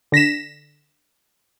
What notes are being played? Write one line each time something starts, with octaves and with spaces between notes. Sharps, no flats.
D3 A#6 B6 E7